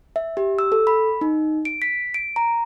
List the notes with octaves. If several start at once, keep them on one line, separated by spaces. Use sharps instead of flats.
E5
G4
E6
A4
B5
D#4
D7
B6
D7
A#5